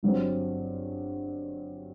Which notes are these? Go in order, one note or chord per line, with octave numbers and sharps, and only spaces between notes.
G1 G2 F#3 C4